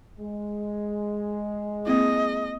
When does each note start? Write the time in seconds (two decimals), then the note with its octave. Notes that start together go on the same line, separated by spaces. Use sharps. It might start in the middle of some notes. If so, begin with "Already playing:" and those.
0.19 G#3
1.86 A#3 C4 E4 D#5